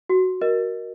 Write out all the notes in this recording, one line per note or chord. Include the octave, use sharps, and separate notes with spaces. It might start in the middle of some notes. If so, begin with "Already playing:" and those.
F#4
A#4 D#5